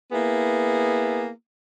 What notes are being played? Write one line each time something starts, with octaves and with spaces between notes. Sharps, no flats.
A#3 B3 E4 G#4